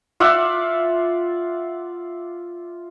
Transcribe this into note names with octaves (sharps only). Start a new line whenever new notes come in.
F4 D5 E5 F#5